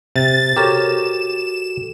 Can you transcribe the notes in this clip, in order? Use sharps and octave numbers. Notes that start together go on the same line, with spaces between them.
C3 A6
F#4 G4 A4 A#4 C#5 E7